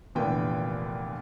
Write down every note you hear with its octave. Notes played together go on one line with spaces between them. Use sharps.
F1 A#2 D3 E3 B3 G5